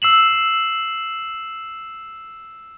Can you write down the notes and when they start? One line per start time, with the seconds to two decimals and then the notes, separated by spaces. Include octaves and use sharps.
0.02 E6 C7 E7 F#7